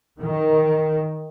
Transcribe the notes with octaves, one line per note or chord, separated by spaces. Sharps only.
D#3